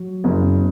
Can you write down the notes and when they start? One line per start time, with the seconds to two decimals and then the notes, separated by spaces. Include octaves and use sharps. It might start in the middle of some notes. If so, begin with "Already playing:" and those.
Already playing: F#3
0.24 F#1